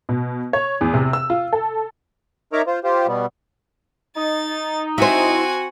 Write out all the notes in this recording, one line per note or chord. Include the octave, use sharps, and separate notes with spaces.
B2
C#5
E2
C3
E6
F4
A4
D#4 A#4 C#5 E5 A#5 D6
F4 C5
F4 G4 C5
B2 G3 B3
D#4 A6
C4 E4 F#4 C5 G#5